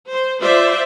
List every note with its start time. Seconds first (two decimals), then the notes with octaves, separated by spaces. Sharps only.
0.10 C5
0.41 F4 C5 D5 E5